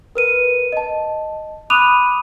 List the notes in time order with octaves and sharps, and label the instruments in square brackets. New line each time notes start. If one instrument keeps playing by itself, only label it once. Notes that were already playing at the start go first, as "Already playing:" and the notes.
[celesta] A#4 B4 D#7
D#5 A5
B5 D6 D#6 F#6 D#7 F7